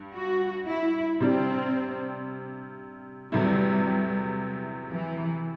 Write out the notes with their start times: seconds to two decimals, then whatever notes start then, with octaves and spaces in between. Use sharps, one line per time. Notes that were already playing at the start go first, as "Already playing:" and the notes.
Already playing: G2
0.14 F#4
0.67 E4
1.21 C3 G3 C4 D4
3.31 E2 C3 F#3 G3 A3 E4
4.90 E3